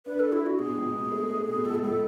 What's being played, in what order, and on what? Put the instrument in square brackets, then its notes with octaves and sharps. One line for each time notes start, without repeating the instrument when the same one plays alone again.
[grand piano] D4 [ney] B4
[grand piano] D4 [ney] A4
[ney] E4
[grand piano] D4
[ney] F#4
[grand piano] B2 [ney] G#4
[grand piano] C#2
B2
A3
A3
B2
[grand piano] C#2 [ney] A4
[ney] G#4
[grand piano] C#2 [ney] A4